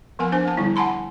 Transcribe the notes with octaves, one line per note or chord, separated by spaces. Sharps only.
F3 B3 A#4 G#5
D4 C5 G#5
B3 A5
D3 G3 E4
F#5 G#5 A5 B5 C6